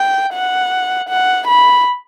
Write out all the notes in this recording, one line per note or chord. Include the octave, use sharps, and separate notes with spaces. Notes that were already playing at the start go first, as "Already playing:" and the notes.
Already playing: G5
F#5
F#5
B5